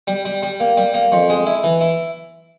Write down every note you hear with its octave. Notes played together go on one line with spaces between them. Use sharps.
G3
G3
G3
A#3
G3
A#3
F2
G#3
E4
E3
E4